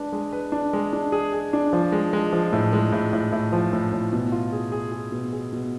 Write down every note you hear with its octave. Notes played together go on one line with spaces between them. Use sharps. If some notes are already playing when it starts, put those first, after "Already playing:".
Already playing: G#3 D4 B4
G#3
B4
D4
G#3
D4
G#4
G#4
D4
F3
G#3
G#3
F3
A2
G#3
A2
A2
A2
F3
A2
A2
B2
F4
G#4
G#4
G#4
B2
G#4
B2